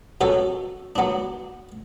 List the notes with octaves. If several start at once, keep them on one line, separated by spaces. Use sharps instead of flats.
B2 F#3 C#4 F#4 A4
F#3 B3 D4